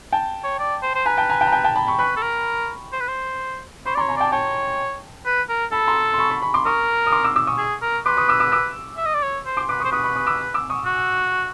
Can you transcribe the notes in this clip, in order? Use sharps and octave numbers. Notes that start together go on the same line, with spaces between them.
G5 A5
C#5
D5
C5
C5
B4 G#5 A#5
G5 A5
G#5 A#5
G5 A5
A#5
G5 A5
G5 A5
A5 B5
B5 C#6
B4 B5 C#6
A4
A#4
C5
B4
C5
C5 B5 C#6
D5
A#5 C6
C#5
G#5 A#5
D5 G5 A5
C#5 G5 A5
B4
A#4
A4 A5 B5
A#5 C6
C6
B5 C#6
B5 C#6
B5 C#6
C6 D6
A#4 C#6 D#6
D#6
C6 D6
D6 E6
D6 E6
C#6 D#6
G#4
A#4
B4 C6 D6
C#6 D#6
D6 E6
D6 E6
D6 E6
E5
D#5
D5
C#5
C5
C6 D6
B4 C6 D6
C#6 D#6
C5
B4 C#6 D#6
B5 C#6
C#6 D#6
D6 E6
D6 E6
C#6 D#6
F#4